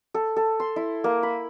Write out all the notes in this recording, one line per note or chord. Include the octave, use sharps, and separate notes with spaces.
A4
A4
C6
E4
A#3
B5